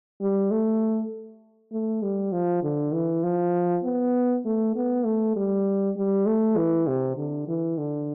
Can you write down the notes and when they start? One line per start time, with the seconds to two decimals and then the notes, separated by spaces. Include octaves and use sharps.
0.21 G3
0.51 A3
1.72 A3
2.02 G3
2.32 F3
2.63 D3
2.94 E3
3.23 F3
3.84 B3
4.45 A3
4.76 B3
5.05 A3
5.36 G3
5.96 G3
6.26 A3
6.57 E3
6.87 C3
7.17 D3
7.48 E3
7.78 D3